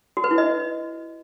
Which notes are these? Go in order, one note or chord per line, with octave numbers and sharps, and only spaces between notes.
F#4
B4
E4
D#5